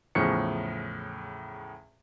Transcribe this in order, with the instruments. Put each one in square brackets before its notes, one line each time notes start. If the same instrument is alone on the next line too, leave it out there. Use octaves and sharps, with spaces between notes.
[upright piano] E2 A2 C#3 F3 C#6 C#7